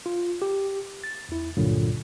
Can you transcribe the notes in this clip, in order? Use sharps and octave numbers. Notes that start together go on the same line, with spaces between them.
F4
G4
A6
E2 E4
C#2 G2 A#2 D3 F#3